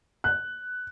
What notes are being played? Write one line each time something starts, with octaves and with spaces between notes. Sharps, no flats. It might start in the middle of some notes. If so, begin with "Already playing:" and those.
F#6